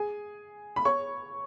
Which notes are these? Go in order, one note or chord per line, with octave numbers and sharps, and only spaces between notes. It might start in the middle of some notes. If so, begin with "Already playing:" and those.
Already playing: G#4 G#5
B5
C#5 C#6